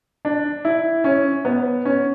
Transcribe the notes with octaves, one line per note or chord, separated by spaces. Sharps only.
D4
E4
C#4
B3
C#4